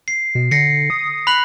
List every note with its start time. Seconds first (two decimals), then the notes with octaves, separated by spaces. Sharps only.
0.08 C7
0.35 B2
0.51 D3 A#6 C7 C#7
0.90 D#6
1.27 B5 F#6 B6 F#7